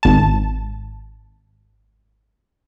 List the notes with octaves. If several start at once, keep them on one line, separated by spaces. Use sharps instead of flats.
G#1 A5